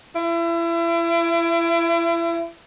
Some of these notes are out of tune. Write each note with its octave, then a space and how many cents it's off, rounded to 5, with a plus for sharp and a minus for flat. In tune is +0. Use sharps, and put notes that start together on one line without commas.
E4 +35